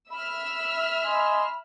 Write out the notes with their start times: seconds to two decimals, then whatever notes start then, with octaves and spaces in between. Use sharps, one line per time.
0.11 E5 B5 E6 F6
1.03 D#5 G#5 C6